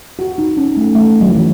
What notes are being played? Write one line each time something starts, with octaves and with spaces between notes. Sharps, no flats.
F#4
D#4
C#4
A3
A3
F#3
E3
F#3